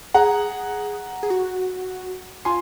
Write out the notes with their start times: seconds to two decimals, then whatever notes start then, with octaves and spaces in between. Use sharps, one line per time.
0.14 G#4 F#5 A#5
1.23 G#4
1.30 F#4
2.45 F4 G#5 C6